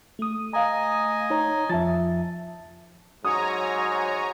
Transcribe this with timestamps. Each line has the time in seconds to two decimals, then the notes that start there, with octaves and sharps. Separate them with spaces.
0.19 A3 D#6
0.53 D#5 F5 G#5 A#5
1.30 D#4 C#5 A#5
1.70 F2 F3 E5 A5 A6
3.25 G#2 F#3 C#5 G#5 A#5 D#6